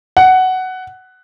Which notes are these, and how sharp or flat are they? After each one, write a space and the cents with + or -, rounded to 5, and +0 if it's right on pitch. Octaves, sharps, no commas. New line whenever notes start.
F#5 +10